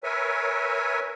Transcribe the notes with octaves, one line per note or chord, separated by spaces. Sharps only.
A#4 B4 C#5 E5 G#5